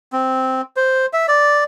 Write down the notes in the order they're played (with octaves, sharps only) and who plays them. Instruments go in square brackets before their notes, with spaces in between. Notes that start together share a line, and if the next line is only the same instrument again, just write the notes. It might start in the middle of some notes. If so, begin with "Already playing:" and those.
[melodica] C4
C5
E5
D5